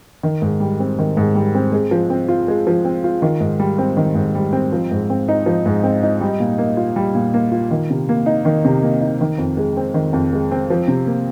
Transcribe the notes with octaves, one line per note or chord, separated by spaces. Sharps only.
D#3
G#2
G3
C4
D#3
G#2
G3
C4
G#3
F3
C4
F4
G#3
F3
C4
F4
D#3
G#2
G3
C4
D#3
G#2
G3
C4
F3
G#2
C4
D#4
F3
G#2
C4
D#4
G3
A#2
A#3
F4
G3
A#2
A#3
F4
D#3
C3
A#3
D#4
D#3
C3
A#3
D#4
D#3
F2
G#3
C4
D#3
F2
G#3
C4
F3
C3
A#3